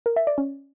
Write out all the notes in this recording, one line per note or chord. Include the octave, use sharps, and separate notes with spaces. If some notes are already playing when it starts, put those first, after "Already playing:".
A#4
E5
D5
C#4